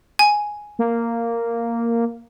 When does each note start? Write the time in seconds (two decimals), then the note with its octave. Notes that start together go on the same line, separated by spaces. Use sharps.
0.19 G#5
0.79 A#3